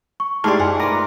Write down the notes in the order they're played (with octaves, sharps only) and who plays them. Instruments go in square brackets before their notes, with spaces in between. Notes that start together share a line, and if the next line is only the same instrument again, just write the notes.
[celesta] C#6
[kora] G#2 E4 D5 [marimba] A3 [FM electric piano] G4 C6 F6 [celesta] A5
[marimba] F#2 G#5 [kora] F#5
[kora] F4 A#4 B4 [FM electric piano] A#5 D6 A#6